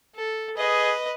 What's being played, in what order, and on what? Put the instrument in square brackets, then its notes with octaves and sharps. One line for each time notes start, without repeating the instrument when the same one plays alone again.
[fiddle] A4
[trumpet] G#4 [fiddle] B4 D#5